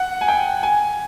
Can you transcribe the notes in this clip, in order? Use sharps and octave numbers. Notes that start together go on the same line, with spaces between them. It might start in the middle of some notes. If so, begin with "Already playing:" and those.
Already playing: F#5
G#5
G5
G#5